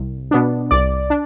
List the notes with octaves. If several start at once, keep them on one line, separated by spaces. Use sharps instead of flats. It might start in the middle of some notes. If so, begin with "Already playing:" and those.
Already playing: C2
B2 B3 D4
C2 D5
D4